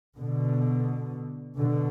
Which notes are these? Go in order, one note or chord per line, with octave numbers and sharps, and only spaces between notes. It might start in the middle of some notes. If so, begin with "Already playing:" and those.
B2 D3
B2 D3